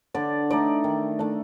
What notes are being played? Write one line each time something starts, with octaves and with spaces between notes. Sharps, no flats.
D3 D5
A3 D#4 D5
D#3
A3 D4